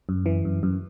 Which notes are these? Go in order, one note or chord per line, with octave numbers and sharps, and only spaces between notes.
F#2
E3
F#2
F#2